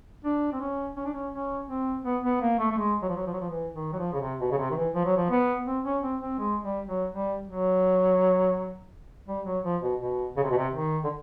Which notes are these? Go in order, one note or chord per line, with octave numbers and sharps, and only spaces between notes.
D4
C4
C#4
C#4
D4
C#4
C#4
C4
B3
B3
A#3
A3
A3
G#3
F#3
F3
F#3
F3
F#3
F3
E3
D#3
F#3
F3
C#3
C3
B2
C#3
C3
D#3
E3
F3
F#3
F3
B3
C4
C#4
C4
C4
G#3
G3
F#3
G3
F#3
G3
F#3
F3
B2
B2
C#3
C3
B2
C3
D#3
D3